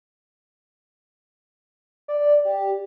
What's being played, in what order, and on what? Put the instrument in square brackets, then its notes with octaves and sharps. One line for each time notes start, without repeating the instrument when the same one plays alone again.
[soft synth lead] D5
G4